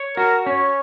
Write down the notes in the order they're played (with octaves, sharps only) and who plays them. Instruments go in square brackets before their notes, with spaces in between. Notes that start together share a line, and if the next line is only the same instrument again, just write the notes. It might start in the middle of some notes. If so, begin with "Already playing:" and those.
Already playing: [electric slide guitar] C#5
[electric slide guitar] F#4 [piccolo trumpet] A#4
[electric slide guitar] C#4 [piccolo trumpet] C#5